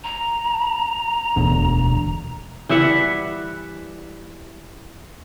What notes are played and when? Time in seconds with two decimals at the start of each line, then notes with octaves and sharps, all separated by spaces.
0.04 A#5
1.36 E1 D2 B2 D3
2.69 E3 G3 E5 F#5